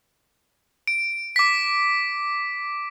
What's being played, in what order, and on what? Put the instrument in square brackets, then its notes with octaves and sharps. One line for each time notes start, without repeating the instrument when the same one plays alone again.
[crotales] D7
D6 B6